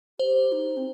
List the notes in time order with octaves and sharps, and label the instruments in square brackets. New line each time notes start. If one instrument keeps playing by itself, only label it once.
[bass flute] G4 [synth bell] C5
[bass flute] D#4
C4